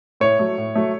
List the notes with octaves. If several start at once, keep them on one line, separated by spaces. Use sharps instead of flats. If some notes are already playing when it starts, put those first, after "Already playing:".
A2 C#5
F#3 A3
A2
F#3 A3